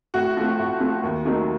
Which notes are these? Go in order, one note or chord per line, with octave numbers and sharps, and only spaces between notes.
A2 F#4
F3 A3
A2
F3 A3
D#2
D#3 F#3 A3 D#4